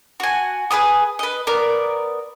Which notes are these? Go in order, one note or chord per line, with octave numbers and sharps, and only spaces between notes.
F#4 G#5
G#4 B4 G#5 D#6
B4 D#5
B3 A#4 D5